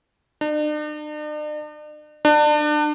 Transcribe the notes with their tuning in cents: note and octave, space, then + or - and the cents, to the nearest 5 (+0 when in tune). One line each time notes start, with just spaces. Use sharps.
D4 +45
D4 +30